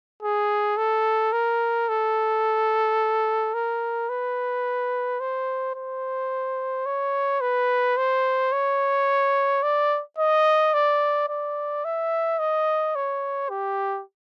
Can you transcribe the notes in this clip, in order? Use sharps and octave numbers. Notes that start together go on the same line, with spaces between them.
G#4
A4
A#4
A4
A#4
B4
C5
C5
C#5
B4
C5
C#5
D5
D#5
D5
D5
E5
D#5
C#5
G4